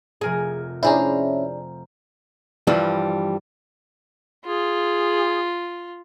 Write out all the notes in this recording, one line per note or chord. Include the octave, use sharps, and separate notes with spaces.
F1 G#4 A#4 G#5
C#4 D4 E4 G#4 C5 A#5
G2 E3 F3 G3
F4 G#4